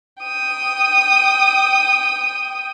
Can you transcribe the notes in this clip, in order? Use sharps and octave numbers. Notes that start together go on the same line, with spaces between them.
G5 D#6